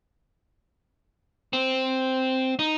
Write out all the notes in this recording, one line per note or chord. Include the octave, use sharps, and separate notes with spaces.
C4
D#4